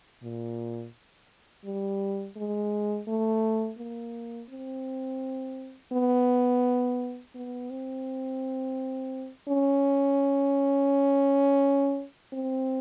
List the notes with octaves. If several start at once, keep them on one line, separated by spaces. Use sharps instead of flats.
A#2
G3
G#3
A3
A#3
C4
B3
B3
C4
C#4
C4